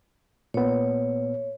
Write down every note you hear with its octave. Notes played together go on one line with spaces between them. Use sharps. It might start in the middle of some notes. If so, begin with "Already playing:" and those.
A#2 B3 C#5